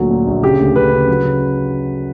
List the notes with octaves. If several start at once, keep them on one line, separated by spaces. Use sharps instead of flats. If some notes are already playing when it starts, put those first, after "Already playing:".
Already playing: D2 A#2 F#3
A#2
A#1
C#3 G4
D2
C#3 B4
C#3
F#3
C#3